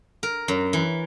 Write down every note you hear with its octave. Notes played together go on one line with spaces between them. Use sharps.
A#4
F#2
E3